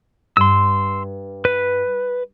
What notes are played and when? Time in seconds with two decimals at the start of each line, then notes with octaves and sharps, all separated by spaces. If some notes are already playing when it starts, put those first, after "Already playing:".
0.37 G2 C6 E6
1.45 B4